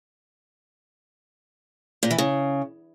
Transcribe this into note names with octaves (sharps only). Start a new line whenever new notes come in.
A#2
E3
C#3